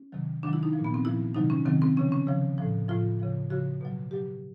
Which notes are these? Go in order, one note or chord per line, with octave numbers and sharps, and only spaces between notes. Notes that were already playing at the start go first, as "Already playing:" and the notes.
Already playing: C#4
C3 D#3 F#3
C3 D#3 F#3 D4
E4
D#4
F3
A#2
B3
C4
A#2 F3 E4
C3 D#3 F#3 D#4
C#4
C3 D#3 F#3 C4
C4
C#3 F3 C#4
C#4
C#3 F3
A2 F3
A2 F3 F4
C#3 F3
C#3 F3 F#4
B2 F#3
B2 F#3 G4